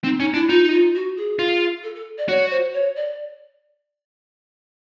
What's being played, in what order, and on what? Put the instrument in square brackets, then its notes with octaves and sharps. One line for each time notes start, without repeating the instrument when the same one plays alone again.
[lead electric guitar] C4 [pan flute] D#4
[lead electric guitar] C#4 [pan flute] D#4
[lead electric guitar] D4 [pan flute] E4
[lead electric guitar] D#4 [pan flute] F4
[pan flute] F4
F#4
G#4
[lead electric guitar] F4
[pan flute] A4
A4
D5
[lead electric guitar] F#4 [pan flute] C#5
[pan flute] C5
C#5
D5